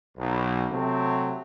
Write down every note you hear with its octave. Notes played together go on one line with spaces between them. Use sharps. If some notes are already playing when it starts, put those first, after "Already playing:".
B1
C3 F#3 A3 C4